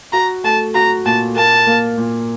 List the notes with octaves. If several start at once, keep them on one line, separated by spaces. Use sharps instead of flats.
F#4 A#5
A3 A5
F#4 A#5
A#2 A5
A#3 A5
A#3
A#2